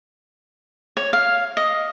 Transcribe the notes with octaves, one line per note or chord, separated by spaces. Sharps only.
C#5
F5
D#5